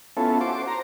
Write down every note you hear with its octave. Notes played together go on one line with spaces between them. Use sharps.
B3 C#4 E4 F4 A4
F#4 C5 D6
C5 A#5